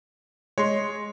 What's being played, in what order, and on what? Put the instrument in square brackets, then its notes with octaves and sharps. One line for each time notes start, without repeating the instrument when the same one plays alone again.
[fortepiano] G#3 [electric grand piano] C#5 C6